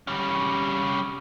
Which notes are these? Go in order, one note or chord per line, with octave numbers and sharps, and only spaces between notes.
G3 C#4